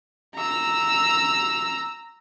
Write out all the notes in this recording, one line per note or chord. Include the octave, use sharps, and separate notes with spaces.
A#5 E6